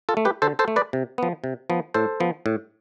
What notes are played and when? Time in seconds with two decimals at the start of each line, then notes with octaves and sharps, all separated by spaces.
0.09 F4 A4
0.17 A3
0.25 G4 B4
0.42 D3 A4 C5
0.59 A4 C5
0.68 A3
0.76 B4 D5
0.93 C3
1.18 F3 B3
1.44 C3
1.70 F3 B3
1.94 A2 A4 C5
2.20 F3 B3
2.46 A2